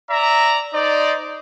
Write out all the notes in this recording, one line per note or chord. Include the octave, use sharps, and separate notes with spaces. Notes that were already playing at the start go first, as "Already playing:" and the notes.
D5 E5 A#5
D#4 C5 D5